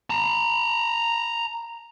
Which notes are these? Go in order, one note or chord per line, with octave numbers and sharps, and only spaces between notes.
A5 A#5